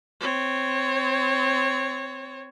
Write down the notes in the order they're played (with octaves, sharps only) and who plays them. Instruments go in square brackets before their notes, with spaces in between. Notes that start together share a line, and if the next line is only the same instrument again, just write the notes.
[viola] C4 C#5